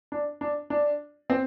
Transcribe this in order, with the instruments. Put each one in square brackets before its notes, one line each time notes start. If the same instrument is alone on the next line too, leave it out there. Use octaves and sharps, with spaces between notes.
[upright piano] D4
D4
D4
C4